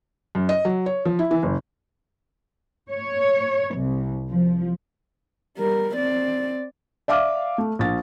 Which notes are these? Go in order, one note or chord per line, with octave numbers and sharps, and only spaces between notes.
F#2
D#5
F#3
C#5
F3
E4
E3
F#1
C#5
C2
F3
G3 A#4
C4 D5
D5 E5 F5 D6 F6
A3
A#1 A6